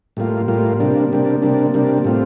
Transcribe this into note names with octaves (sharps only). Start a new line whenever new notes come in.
A2 G3 A#3 F4
A2 G3 A#3 F4
C3 G3 A#3 D4
C3 G3 A#3 D4
C3 G3 A#3 D4
C3 G3 A#3 D4
A2 G3 C4 F4